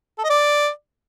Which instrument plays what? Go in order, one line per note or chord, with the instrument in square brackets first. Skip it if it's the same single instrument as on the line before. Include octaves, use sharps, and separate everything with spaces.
[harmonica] A4
D#5
D5